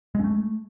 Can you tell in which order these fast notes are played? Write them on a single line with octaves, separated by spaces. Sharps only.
G#3 C#4 A3